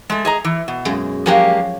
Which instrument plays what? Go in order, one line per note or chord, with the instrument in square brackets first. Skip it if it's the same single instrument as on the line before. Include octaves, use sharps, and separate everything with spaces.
[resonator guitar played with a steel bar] G#3 A3
G#4 D#5 A#5
E3
B2
[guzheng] F#2 G#3
[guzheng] F3 F#3 F#4 [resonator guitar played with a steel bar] G#3 A#3 G4